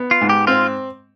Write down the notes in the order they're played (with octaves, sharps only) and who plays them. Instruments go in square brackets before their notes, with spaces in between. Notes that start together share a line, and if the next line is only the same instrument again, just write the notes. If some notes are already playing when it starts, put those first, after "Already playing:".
Already playing: [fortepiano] B3
[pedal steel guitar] F4
[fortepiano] G#2
[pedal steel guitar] G4
[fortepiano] C4 [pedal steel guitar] F4